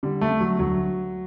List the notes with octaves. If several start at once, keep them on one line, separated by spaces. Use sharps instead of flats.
D3 G3
A3
D3
F#3
D2 F#3